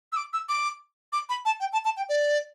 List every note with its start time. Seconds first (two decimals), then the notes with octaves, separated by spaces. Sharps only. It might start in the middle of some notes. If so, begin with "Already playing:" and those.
0.12 E6
0.17 D6
0.33 E6
0.49 D6
1.13 D6
1.29 B5
1.45 A5
1.60 G5
1.73 A5
1.85 A5
1.97 G5
2.09 D5